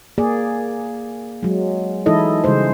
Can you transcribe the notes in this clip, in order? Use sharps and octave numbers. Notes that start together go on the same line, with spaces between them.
A#3 G#4 D5
F#3 G#3
E3 G#3 D#4 E4 A4 D#5
C#3 G3 G#3 C5